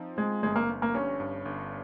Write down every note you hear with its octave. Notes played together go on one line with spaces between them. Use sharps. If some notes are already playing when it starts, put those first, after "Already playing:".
Already playing: F3 C4 D#4
G#3 C4
G1 G#3
A#3
G1
A#3
G2 C#4
G2
G1